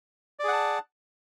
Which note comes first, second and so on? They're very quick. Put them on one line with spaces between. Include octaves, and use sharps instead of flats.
D5 G#4 F#5 A5